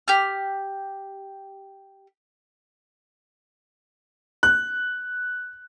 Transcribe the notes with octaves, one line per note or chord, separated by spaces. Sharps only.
G4 F6
F#6